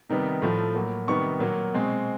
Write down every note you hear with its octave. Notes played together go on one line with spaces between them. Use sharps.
C3 D#3 G3 B3
A2 F3 A3
A2 F#3 A#3
C3 D#3 G3 B3 C#6
A#2 F#3 A#3
B2 G#3 C4